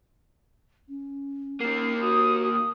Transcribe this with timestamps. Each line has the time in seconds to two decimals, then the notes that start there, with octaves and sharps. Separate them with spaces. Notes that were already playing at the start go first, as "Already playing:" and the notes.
0.89 C#4
1.60 D#3 A#3 C7
2.01 F#4 D#6
2.43 D#6